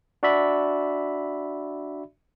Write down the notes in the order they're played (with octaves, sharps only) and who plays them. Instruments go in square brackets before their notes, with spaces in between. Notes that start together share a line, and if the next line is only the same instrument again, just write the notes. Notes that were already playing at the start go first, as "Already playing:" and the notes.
[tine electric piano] D4 F#4 D5 E5 B5